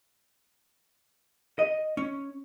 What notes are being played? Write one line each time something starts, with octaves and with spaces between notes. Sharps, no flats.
D#5
C#4